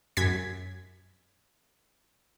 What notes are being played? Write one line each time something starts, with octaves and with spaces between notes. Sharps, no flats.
F#2 G#6 B6